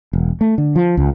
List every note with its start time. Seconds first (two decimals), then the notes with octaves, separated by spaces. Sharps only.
0.13 E1
0.41 A3
0.58 D3
0.76 F3
0.97 C#2